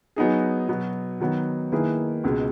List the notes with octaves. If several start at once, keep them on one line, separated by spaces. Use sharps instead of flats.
F#3 B3 D#4 G#4
B2 F#3 B3
D#3 F#3 B3
D#3 A#3 E4 G#4 B4
C#2 B2 G#3